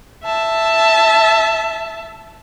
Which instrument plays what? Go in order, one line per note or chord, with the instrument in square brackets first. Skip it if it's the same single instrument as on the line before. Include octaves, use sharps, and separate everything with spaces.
[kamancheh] E5 A5